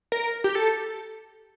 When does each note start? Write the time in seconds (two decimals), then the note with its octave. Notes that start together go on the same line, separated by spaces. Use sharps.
0.12 A#4
0.44 G4
0.55 A4